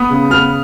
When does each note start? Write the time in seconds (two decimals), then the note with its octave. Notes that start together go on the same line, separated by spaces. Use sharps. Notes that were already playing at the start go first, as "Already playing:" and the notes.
Already playing: B3 D#6
0.10 C#3
0.30 B3 F6